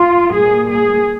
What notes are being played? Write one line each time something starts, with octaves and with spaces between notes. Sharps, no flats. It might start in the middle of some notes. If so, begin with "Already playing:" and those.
Already playing: F4
A#2 G3 A#3 G#4
G#4